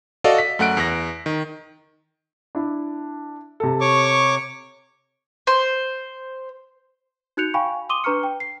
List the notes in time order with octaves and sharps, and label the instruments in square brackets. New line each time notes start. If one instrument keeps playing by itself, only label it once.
[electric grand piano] F#4 A4 D5 D#5 F5
B6
F#2 A3 F#5 F#6 D7
E2 F#6 A#6
D#3
[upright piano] D4 E4
C3 A4
[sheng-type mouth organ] C#5 C#6 D6
[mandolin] C5
[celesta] D#4 F#4 F#6 G6 C#7 F7
F5 G5 G#5 B5 C#6
C6 D6 D#6 D#7 G7
D4 B4 A#5 C#6 F6 C#7
G5
C7